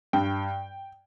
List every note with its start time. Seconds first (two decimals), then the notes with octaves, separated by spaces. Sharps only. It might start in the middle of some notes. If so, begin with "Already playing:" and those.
0.13 G2 G5